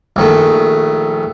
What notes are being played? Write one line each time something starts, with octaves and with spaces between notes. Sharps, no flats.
A#1 D#3 A3